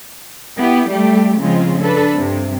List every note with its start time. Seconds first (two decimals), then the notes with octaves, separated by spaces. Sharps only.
0.57 B3 E4 G4
0.90 G3 A3 G4
1.40 C#3 F3 G#3 C4 F4
1.81 D4 A4 B4
2.14 G2 C3